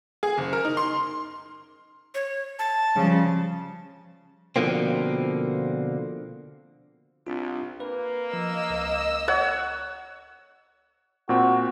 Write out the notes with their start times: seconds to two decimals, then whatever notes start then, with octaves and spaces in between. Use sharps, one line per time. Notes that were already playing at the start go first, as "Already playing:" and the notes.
0.23 G#4
0.38 F#1
0.53 A#4
0.65 D#4
0.77 C6
2.15 C#5
2.59 A5
2.96 C#3 F3 G3
4.56 B2 D3 F3 A#3 C4
7.27 C2 C4 D4 F4
7.80 A#3 B4
8.33 F3 D#5 E6
8.70 C#2
9.28 C#5 F#5
11.29 A#2 C4 F#4